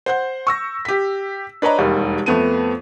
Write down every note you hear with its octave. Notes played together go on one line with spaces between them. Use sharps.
C5 F#5 G6
C#6 E6 A#6
G4 B6
D4 B4 C#5 D#5 A#5
E1 D#2 D#3 G3
F2 A3 B3 A5 D#7